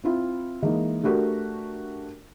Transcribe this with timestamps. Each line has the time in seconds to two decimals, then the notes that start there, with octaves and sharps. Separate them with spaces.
0.04 C4 E4 F4
0.63 E3 G#3 A#3 D#4
1.03 A3 D4 F#4 G4 A#4